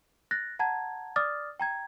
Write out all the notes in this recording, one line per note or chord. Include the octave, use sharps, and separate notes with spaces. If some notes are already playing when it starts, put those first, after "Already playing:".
F#6 A6 A#6
F#5 A5 A#5 G#6
D5 D6 D#6 F6 A6
G5 A#5 G#6